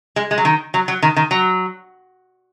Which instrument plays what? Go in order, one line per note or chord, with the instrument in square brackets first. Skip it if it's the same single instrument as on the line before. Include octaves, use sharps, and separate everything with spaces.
[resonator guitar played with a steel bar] G#3
G#3
F#3
D#3
F#3
F#3
D#3
D#3
F#3